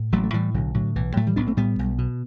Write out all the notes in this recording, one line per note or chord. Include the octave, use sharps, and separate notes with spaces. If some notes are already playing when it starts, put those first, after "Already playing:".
Already playing: A2
A1 F#3 A3
A3
A2 E3 G3
B1 D3 F#3
A2 D3 F#3
B1 E3
A2 F#3 A3
E3 G3
B1 B3 D4
A3 C4
A2 G3 B3
B1
B2